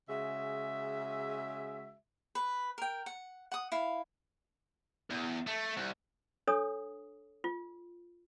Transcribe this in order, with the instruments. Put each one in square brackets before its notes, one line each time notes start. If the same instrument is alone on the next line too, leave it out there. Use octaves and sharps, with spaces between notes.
[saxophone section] C#3 G#3 F#4 E5
[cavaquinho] B4
A#4 G5
F#5
F#5 D#6
E4 F5
[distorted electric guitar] E2
A3
C2
[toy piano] D4 A4 C#5 D#6
F4